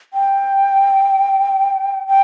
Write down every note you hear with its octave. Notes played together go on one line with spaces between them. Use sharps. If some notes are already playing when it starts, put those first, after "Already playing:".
G5
G5